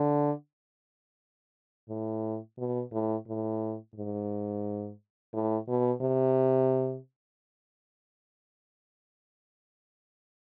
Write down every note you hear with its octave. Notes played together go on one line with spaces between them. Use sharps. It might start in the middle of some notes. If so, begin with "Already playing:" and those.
Already playing: D3
A2
B2
A2
A2
G#2
A2
B2
C3